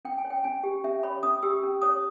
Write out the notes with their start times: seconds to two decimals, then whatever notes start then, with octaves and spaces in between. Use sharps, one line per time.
0.05 C#4 G5
0.18 G#5
0.25 C#5
0.30 G5
0.44 C#4 G#5
0.64 G4
0.84 C#4 E5
1.03 C#5 B5
1.23 C#4 D#6
1.43 G4 E6
1.63 C#4
1.82 C#5 D#6